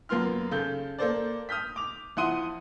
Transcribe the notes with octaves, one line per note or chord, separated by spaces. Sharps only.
F#2 A#3 B3 F4 C6 F6
C#3 A4 G6
A#3 A4 C5 D5
D#6 F6 G6 B6
D6 F7
F2 E4 F#5 C6 D#6 D#7